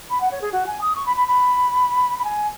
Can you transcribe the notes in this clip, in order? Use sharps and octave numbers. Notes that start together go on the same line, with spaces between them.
B5
F#5
C#5
G#4
F#4
G#5
D#6
C#6
B5
B5
B5
B5
G#5